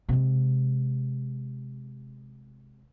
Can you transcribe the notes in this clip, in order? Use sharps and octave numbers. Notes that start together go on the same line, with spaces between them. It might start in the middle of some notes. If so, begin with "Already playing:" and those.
C3 G#3